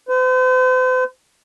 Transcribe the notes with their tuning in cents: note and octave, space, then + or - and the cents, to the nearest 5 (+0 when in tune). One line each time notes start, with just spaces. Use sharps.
C5 -45